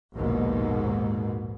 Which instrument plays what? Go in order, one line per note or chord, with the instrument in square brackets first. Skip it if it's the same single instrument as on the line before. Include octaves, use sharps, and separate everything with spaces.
[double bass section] A#1 D#2 G#2 B2